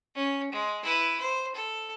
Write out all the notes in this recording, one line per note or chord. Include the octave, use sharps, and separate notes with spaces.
C#4
G#3
E4 B4
C5
A4